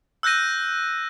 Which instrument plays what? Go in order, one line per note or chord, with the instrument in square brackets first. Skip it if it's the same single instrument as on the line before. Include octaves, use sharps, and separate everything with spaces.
[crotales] E6 F#6 G6 A#6 D#7